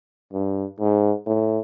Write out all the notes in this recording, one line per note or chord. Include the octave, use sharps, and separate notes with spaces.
G2
G#2
A2